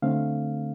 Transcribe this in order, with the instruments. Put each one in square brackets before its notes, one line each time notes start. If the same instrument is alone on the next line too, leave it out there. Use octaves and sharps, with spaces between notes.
[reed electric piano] D3 A3 C4 F5